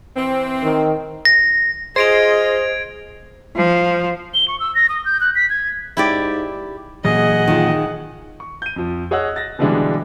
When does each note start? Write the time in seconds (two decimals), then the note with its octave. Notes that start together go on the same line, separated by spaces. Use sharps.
0.16 E3 C4
0.63 D#3
1.25 A#6
1.96 F4 G#4 C5 D#5 G#6 D7 F7
3.56 F3
4.34 G7
4.48 C#6
4.60 E6
4.75 A#6
4.89 D#6
5.05 G6
5.21 F#6
5.35 B6
5.50 G#6
5.97 G#2 E4 G4 D5
7.04 A#2 E3 F#3 G#4 D#5 F#5
7.48 D#3 F4
8.40 C#6
8.62 G6 D#7
8.76 F2 F3
9.11 G#4 C#5 D#5 F#5 E6 F#6
9.36 A6 A#6
9.59 B2 D3 E3 G3 G#3 D4